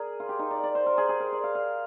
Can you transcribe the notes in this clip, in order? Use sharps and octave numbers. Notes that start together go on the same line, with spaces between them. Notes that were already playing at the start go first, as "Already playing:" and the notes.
Already playing: G#4 A#4 D5
F4
G4
D#4
D5
D5
C5
A#4
G#4
G#4
A#4
D5
F5
F5